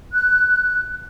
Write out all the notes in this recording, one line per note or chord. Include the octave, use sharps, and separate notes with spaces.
F#6